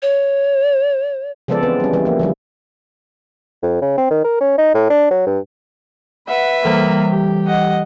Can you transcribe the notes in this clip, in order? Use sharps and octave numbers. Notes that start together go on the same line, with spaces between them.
C#5
C#3 F3 G#3 B3 A4 D5
E3 B3 C4
G3 C#4
E3 G3
F3 A#3
D3 F3 G3
F2
C#3
C4
D#3
A#4
C#4
D#4
A2
D4
F#3
G2
B4 E5 F#5
E3 G3 A#3
G4
D#5 F#5